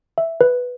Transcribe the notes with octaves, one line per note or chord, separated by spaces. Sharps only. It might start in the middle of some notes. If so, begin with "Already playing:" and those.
E5
B4